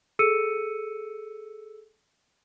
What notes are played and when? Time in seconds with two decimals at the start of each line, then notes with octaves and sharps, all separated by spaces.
0.19 G#4 A4 E6 C#7 D#7